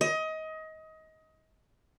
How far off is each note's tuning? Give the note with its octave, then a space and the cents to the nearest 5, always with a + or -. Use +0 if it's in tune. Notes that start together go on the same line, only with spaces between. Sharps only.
D#5 +25